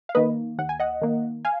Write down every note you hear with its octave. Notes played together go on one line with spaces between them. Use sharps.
F5
D#3 A#3 B4 D#5
D#2 F#5
G#5
D#5 F#5
D#3 A#3
F5 G#5